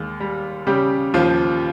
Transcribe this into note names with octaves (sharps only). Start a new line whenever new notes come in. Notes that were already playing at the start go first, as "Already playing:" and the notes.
Already playing: D#2 G#3
G3
C#3 G3 G4
D#2 F3 F4